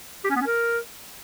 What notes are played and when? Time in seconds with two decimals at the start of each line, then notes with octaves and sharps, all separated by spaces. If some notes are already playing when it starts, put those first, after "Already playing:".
0.24 G4
0.30 C#4
0.35 B3
0.41 C#4
0.46 A#4